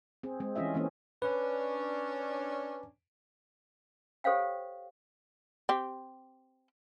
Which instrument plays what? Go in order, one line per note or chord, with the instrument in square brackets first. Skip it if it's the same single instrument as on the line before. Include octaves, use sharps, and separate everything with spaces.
[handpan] C4 G#4
G#3 C4
E3 A3 C#4 F4 D#5 E5
E3 A3 A#3 C4 C#4
[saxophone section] C#4 D4 [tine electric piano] B4
[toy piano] G4 A4 C5 C#5 F5 G5
[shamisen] C4 G4